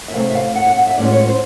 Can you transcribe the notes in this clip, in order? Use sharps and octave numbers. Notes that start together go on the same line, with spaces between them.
E5
C3 E3 A3 C4 F5
E5
F5
F#5
F#5
F5
E5
A2 E3 G#3 C#4 F4 D5
C#5
C5